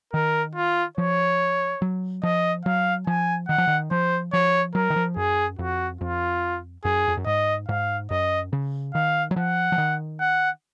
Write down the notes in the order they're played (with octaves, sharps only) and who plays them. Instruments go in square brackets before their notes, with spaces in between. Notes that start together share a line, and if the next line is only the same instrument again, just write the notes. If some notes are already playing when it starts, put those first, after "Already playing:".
[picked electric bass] D#3 [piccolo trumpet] A#4
[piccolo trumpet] F4
[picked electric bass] F3 [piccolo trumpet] C#5
[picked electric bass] F#3
[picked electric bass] F3 [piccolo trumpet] D#5
[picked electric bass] F#3 [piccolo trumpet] F5
[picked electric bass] F3 [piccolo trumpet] G#5
[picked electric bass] D#3 [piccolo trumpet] F#5
[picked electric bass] F3
D#3
[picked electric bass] F3 [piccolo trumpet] C5
[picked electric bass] F3 [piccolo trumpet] C#5
[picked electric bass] F#3 [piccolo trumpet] A#4
[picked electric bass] D#3
F3
[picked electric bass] F#2 [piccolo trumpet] G#4
[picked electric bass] F2 [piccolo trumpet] F#4
[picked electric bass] F2 [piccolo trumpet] F4
[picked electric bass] F#2 [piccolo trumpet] G#4
[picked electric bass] F2
F#2
[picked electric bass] G#2 [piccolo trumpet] D#5
[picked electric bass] G#2 [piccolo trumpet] F5
[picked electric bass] F#2 [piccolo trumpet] D#5
[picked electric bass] C#3
[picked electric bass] D#3 [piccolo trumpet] F5
[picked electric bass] F#3
[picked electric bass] F3 [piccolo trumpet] F#5
[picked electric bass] F3
D#3
[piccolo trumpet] F#5